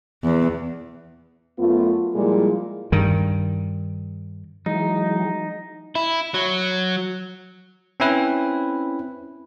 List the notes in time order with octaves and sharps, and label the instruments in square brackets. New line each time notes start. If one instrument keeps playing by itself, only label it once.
[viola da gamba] E2
[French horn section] F#2 A3 B3 F4
A#2 F3 G3 G#3 E4 G#4
[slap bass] G2 D#3
[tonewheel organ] E3 F#3 G#3 [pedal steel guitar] D#4
[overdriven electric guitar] E4
F#3
[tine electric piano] C4 C#4 E4 B4